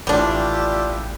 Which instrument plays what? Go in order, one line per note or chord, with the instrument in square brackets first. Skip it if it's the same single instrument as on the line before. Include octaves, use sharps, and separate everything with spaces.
[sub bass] A1 [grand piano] A2 E3 [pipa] G3 D4 [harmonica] F4 G4 E5